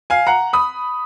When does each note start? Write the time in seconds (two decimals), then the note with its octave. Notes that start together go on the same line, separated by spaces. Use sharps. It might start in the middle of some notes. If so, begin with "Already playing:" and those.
0.10 F5 G#5
0.27 F#5 A#5
0.53 B5 D#6